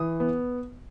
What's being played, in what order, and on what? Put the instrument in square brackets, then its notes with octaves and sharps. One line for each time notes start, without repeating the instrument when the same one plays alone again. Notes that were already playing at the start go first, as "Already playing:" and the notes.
Already playing: [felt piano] E3 D#6
B3